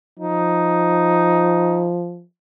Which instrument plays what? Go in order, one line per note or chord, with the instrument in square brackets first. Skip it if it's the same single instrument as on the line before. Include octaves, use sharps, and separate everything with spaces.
[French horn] F3 [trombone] D#4